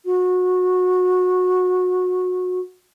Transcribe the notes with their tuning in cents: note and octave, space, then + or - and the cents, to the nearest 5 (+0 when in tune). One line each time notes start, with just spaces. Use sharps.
F#4 -20